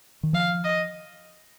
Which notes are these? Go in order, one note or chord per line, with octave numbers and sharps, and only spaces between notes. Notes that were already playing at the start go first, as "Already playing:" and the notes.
D#3
F3 F5
D#5